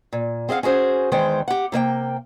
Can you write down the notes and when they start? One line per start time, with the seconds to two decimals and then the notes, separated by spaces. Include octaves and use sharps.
0.13 A#2
0.49 C4 G#4 D#5 F5 F#5
0.63 C#4 F#4 G#4 C5
1.12 E2 D#3 G#3 C5 G5
1.48 G4 F#5
1.72 C3 A#3 D5 G5